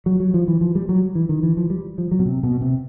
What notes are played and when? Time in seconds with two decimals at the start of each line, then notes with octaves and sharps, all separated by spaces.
0.06 F#3
0.20 F#3
0.34 F3
0.48 E3
0.61 F3
0.75 G3
0.89 F#3
1.15 E3
1.29 D#3
1.43 E3
1.57 F3
1.70 G3
1.98 F3
2.11 F#3
2.19 B2
2.26 C3
2.43 B2
2.61 C3